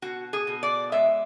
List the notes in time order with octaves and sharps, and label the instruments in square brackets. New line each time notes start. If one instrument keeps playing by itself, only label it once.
[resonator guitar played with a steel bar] B2 F#4
G#4
B2
D5
G#3 E5